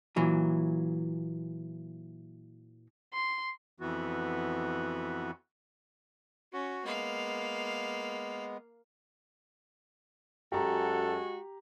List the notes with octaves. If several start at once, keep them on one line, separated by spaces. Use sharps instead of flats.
A#2 E3 F#3
C6
F2 E3 B3 F#4
C#4 F#4
G#3 A#3 B3 F5
F#2 G#3 F#4 G4 A4 A#5